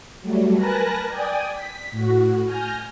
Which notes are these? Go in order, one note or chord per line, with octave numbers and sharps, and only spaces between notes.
F#3 G3 A3
A#4 B4 G#5 A5 F#6 A#6
D5 G5 G#5 D#6
B6
A2 F#4
G#5 F6 G6 A#6